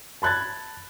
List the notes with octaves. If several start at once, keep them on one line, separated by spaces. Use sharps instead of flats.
A5 B5 F#6 G#6 A6